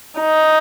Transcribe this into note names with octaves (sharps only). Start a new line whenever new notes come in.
D#4